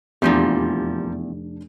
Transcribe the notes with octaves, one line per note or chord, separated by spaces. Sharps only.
F1 E2 A#2 F3 G3 D4